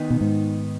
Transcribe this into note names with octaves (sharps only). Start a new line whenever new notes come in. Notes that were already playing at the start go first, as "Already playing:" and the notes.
Already playing: D#3 B3 D#4
B2
G#2